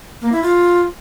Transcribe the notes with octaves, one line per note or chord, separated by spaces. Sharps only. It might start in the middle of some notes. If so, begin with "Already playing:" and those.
A#3
E4
F4